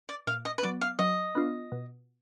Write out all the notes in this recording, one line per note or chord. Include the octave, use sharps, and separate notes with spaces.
D5
A#2 F5
D#5
B4
F#3 B3 D5
F5
F#3 D#5
B3 D4 F4
B2